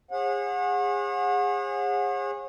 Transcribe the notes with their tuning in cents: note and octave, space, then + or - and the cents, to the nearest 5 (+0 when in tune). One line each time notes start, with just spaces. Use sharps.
G#4 -30 C#5 -45 F#5 -30